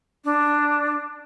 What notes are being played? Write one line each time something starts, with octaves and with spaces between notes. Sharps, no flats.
D4